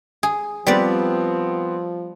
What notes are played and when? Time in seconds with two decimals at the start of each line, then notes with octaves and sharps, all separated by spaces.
0.23 G#4
0.67 F3 G3 B3 C4 B4 D5